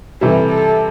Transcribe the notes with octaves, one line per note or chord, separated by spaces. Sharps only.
C3 E3 G3 A4
A4